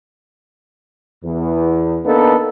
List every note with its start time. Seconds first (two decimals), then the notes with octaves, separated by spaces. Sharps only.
1.24 E2
2.04 A#3 B3 D4 D#4 A4